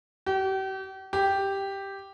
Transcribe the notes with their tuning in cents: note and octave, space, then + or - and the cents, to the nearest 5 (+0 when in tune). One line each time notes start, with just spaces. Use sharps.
G4 -40
G4 +0